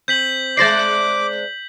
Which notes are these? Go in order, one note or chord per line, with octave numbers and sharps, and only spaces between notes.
C4 G6 B6 F#7
G#3 C5 D5 D6 A6 A#6 C7